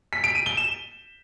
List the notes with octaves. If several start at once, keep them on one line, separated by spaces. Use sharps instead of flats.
B6
D7
D#7
G7
E7